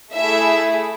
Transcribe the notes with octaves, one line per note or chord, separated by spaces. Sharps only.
A3 E4 G#4 E5